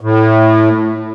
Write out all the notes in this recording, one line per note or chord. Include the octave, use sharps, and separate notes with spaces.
A2